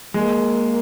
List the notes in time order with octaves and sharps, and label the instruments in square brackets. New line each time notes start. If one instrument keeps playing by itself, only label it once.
[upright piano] G#3 [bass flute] A#3